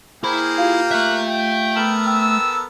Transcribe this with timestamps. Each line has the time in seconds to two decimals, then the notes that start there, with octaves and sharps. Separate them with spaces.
0.24 A#3 E4 G#4 A#4 C5 G5 B5
0.58 F4 G4 F5
0.91 A3 E5 F#6
1.27 G5
1.76 B3 A4 A#4 F6 E7 F#7
2.06 G5 E6